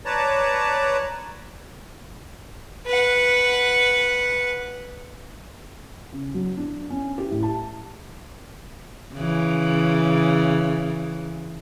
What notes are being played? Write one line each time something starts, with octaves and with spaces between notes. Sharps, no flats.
B4 C#5 D5 A5 A#5
B4 F#5
C#3
F#3
D4
C#4
G4
A2
A5
C#3 E3